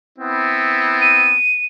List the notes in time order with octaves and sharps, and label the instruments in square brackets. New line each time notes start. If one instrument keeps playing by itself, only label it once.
[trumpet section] B3 C4 E4
[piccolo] D#7